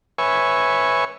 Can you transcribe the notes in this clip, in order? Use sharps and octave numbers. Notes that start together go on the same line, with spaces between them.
B4 C#5 E5 G#5 C#6